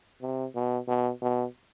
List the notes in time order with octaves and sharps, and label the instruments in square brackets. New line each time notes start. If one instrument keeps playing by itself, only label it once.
[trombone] C3
B2
B2
B2